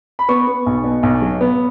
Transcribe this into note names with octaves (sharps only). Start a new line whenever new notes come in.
B5
B3 C#6
B3
B1
B2
B1
F#3
B3